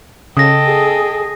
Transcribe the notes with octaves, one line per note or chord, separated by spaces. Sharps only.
C#3 A4 D#5 G5 D#6 A#6
G#4